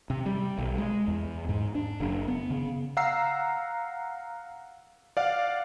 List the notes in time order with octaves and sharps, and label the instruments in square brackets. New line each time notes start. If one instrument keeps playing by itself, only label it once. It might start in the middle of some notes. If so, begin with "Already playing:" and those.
[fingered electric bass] C3
G3
B1
G#3
E2
G#2
D4
F#1
B3
C#3
[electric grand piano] F5 F#5 A#5 E6 C7
D5 F5 F#5